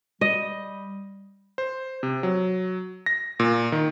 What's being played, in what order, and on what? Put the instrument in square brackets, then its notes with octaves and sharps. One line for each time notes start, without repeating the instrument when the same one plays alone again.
[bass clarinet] G3 [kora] D#5
[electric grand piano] C5
C3
F#3
A#6
A#2
D#3